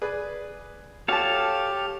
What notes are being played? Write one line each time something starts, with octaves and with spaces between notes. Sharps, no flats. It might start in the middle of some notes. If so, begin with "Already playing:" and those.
G#4 B4 D5
F#4 G4 A4 C#5 F5 A5